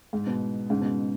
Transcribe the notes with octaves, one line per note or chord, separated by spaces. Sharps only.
G#2
B2
G#2 C#3
B2